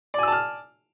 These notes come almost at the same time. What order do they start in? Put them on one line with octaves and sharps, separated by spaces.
D5 G#5 E6 A5 F6